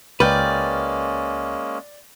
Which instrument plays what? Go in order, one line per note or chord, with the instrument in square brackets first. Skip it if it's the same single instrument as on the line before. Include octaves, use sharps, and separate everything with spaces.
[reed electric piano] C#2 F6 [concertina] G#3 A#3 C#4 [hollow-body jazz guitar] B4 [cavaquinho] D5 G5